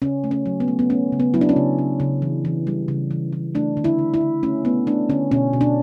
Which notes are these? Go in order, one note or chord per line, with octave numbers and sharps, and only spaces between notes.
C#3 C#4
A3
C#4
F#3
B3
A3
B3
A3 C#4
C#3
B3
F#3 E4
D4
C#4
C#3
C#3
C#3
E3
E3
G3
C#3
E3
E3
A3 D4
D3
E4
D3
E4
D3
A3 C#4
A3 B3
A3 D4
D3 C#4
B2 C#4
B2
D4